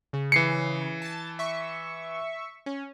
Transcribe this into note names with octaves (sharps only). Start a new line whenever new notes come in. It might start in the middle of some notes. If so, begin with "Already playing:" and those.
C#3
E3 C7 C#7
A5 A6
E5 C#6
C#4